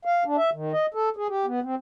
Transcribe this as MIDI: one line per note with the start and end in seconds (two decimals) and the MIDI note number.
0.05 0.24 77
0.25 0.36 62
0.37 0.50 76
0.53 0.72 51
0.72 0.86 75
0.94 1.09 69
1.17 1.27 68
1.29 1.46 67
1.46 1.60 59
1.63 1.75 60